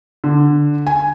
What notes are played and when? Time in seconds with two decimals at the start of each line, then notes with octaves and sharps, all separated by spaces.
0.24 D3
0.87 G#5